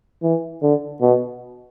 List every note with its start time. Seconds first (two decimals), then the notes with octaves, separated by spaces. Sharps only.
0.23 E3
0.62 D3
1.01 B2